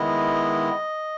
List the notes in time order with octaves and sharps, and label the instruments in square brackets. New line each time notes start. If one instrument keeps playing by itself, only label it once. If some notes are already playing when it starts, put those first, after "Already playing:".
Already playing: [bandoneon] D#3 G#3 B3 E4 D#5